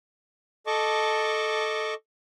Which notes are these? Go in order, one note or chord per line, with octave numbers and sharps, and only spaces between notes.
A4 D#5 A5 C#6 D6